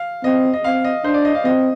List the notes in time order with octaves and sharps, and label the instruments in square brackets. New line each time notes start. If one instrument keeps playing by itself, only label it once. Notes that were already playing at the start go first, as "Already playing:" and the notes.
Already playing: [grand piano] F5
[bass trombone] C4 [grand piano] D#5
[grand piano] D#5
[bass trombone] C4 [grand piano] F5
[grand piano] D#5
[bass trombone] D4 [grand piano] C5
[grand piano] D5
D#5
F5
[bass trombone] C4 [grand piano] D#5